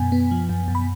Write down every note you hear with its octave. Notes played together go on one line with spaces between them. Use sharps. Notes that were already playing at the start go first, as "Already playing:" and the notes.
Already playing: F#2 B2 B3 G#5
B3
F3
F#2
F#2
B5